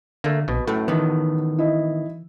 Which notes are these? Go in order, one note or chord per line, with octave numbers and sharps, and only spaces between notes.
D3 A3 A#3
A#1 B2 B4
F#2 A2 A3
D#3 E3 B3
E4 D#5